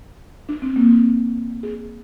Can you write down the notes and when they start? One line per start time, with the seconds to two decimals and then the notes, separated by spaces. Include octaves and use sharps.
0.49 D4
0.62 C4
0.76 A#3
0.89 C4
1.63 G#4